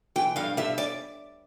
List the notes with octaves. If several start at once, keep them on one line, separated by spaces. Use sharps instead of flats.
E3 G5
G2 F5
G2 E5
D5